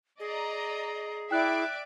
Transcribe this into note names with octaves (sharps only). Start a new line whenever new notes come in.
G#4 D5 D#5 A#5
E4 D5 E5 G5 D6 F#6